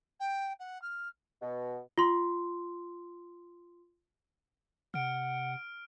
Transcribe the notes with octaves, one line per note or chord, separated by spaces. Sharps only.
G5
F#5
F6
B2
F4 C6
C3 F#5 F6 D7